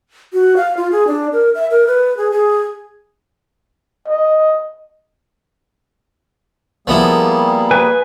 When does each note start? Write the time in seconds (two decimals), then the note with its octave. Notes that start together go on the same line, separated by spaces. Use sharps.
0.34 F#4
0.57 F5
0.77 F4
0.92 G#4
1.07 D4
1.33 A#4
1.55 E5
1.71 A#4
1.87 B4
2.17 G#4
2.32 G#4
4.08 D#5
6.87 F3 G3 A#3 B3 E4 G#4
7.71 B4 G#5